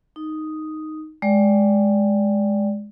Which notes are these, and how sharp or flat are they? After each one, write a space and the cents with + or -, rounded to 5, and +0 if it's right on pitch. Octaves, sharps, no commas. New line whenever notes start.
D#4 +0 D#6 +0
G#3 +0 D5 -10 G5 +0